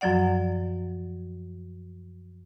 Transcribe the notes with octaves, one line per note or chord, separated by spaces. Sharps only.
F#2 F3 F#3 D5 F#5